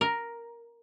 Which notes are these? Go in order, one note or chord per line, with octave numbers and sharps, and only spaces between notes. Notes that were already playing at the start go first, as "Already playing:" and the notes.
A#4